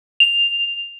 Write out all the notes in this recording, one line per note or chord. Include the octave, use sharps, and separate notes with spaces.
F7